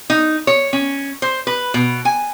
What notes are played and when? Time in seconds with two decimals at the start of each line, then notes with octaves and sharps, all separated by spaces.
0.10 D#4
0.47 C#5
0.73 C#4
1.22 C5
1.47 B4
1.74 B2
2.05 G#5